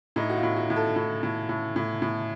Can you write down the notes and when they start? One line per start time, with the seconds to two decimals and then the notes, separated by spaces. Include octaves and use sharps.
0.16 A2 D#4
0.30 F#4
0.37 F4
0.43 A2
0.56 F#4
0.70 A2
0.76 A4
0.96 A2
1.23 A2
1.49 A2
1.76 A2
2.02 A2